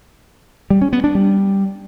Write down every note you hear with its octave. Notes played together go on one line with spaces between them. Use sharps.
G3
C#4
B3
D4
G3